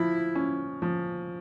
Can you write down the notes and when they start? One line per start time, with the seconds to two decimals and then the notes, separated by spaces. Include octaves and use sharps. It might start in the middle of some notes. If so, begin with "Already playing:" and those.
Already playing: F3 E4
0.35 C#4
0.82 F3